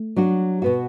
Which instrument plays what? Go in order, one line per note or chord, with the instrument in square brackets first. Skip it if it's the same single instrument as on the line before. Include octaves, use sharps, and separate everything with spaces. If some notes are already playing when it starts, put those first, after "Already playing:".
Already playing: [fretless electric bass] A3
[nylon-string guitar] F#3 D4 F#4
B2 B3 F#4